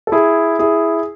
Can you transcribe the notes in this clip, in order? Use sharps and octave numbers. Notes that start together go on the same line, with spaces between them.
A4
E4 G#4
E4 G#4